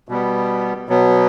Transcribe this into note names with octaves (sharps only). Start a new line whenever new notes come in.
B2 G3 B3
B2 F#3 B3